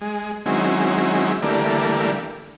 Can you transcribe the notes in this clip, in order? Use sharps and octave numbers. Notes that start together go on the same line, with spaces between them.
G#3
D#3 F#3 G#3 C4 C#4 E4
D3 E3 G3 A3 A#3